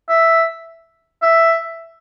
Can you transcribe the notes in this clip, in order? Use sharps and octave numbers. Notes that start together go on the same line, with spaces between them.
E5
E5